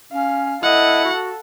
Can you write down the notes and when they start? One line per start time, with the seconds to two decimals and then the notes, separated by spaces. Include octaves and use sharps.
0.13 C#4 F5
0.63 E4 A4 D#5 F#5
1.05 F#4